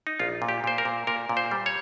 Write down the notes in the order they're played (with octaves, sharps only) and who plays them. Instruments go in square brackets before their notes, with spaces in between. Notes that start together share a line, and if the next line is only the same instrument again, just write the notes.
[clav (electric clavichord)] D#4
A#1 F4
A#2
G4
A#2 C5
A#4
A#2
A#2 A#4
A#2
C5
G3
C#5